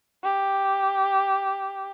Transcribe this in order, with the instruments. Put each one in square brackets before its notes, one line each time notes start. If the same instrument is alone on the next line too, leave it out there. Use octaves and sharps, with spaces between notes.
[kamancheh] G4